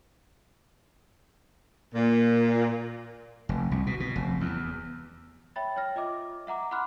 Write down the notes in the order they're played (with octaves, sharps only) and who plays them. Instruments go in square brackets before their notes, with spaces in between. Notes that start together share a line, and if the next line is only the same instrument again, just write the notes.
[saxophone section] A#2
[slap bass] F1
C2
B2
B2
F1
E2
[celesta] C#5 E5 G5 B5 A6
C#5 G5 F6 A#6
F4 D#5 E5 D6
E5 F#5 A#5 D6
F#5 B5 C6 D6 F6 F#6